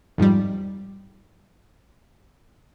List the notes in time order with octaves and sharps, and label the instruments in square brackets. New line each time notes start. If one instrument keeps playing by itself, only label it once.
[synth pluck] F2 G#2 F3 G3